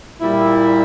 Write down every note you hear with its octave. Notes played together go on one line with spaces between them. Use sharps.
A#2 G3 E4